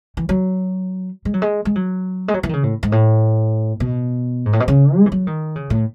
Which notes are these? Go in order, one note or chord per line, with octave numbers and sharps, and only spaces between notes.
E3
F#3
G#3
F#3
G#3
G#3
F#3
G#3
F#3
E3
D#3
C#3
A2
G#2
A2
B2
G#2
A2
B2
C#3
G#3
E3
F#3
D#3
C#3
A2